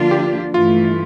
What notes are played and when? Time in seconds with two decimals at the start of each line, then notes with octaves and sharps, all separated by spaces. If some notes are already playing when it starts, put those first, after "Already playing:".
Already playing: D3 F3 A#3 D4 F4
0.11 G4
0.54 G2 E3 A3 F4